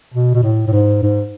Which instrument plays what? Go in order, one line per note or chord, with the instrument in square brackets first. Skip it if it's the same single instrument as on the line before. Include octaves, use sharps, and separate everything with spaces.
[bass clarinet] B2
B2
A2
A2
G#2
G#2